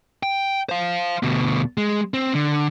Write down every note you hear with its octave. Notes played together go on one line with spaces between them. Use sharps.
G5
C5 F5
D2 B2
G#3
C4
D3